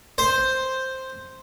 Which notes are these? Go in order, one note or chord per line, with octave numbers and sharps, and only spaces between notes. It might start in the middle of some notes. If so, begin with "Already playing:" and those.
C5